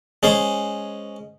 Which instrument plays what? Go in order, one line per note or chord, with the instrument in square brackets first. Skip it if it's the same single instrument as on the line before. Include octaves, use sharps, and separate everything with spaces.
[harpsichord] G#3 C#4 C5